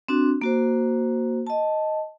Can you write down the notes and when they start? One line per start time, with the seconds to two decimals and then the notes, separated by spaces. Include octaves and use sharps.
0.08 C4 D4 F#4
0.41 A#3 F#4 C5
1.47 D#5 A5